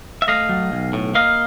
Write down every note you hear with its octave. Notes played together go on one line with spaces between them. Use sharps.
E5
A3 D#5 F5
F#3
B1
A2
A#3 D#5 F5